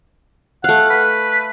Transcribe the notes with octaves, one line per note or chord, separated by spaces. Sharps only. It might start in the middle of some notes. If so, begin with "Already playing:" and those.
A3 F5 F#5
B4